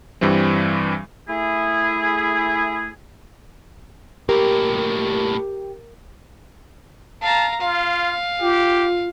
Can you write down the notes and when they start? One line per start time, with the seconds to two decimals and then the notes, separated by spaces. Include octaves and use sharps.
0.21 G2 E3 G3 C4
1.28 A3 E4 G#4
4.29 A2 A#3 G4 A#4
7.22 F5 A5 A#5
7.61 F4 F5
8.41 F4 G4